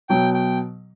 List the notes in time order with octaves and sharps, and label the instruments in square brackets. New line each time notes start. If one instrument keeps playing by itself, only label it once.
[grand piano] B2 F#3 [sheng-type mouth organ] G5
[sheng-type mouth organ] G5